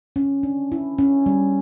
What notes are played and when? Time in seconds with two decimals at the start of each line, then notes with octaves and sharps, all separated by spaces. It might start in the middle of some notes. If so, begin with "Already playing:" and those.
0.16 C#4
0.43 D4
0.72 E4
0.98 C#4
1.26 G3